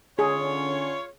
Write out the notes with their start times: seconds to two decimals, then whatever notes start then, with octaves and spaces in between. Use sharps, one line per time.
0.19 D3 C#4 F4 G#4 C#5